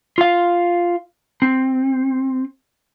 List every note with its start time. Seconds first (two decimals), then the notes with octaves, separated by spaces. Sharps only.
0.18 F4 F5
1.42 C4